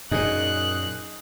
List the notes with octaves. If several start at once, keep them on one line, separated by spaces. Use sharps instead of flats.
F#2 A#2 D#4 G#4 F#6